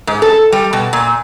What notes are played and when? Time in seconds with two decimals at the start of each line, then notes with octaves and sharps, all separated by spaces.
0.07 G#2
0.22 A4
0.52 G3
0.73 B2
0.93 A#2